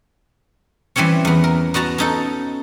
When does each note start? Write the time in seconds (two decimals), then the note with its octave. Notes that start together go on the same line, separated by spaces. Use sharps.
0.96 E3 G3 C4 C#4 C#5
1.25 E2 B3
1.44 A#4
1.74 B3 F#4 A5 A#5
1.98 C#4 D#4 A4